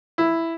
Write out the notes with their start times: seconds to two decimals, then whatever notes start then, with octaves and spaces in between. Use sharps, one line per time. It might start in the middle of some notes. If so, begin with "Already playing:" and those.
0.18 E4